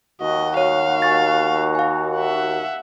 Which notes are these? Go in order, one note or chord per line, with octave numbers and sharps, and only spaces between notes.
D#2 F#4 D#5
C#5 F5 F#5
G#5 C#6 A6
F5 G#5
E5 F#5